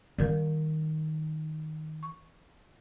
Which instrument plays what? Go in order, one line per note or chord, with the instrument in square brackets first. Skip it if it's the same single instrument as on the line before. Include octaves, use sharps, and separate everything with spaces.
[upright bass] D#3 [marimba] G3 A#4 D5
[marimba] C#6